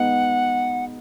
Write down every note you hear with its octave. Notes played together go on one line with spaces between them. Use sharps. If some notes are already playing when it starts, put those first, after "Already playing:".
Already playing: G#3 B3 D#4 F#5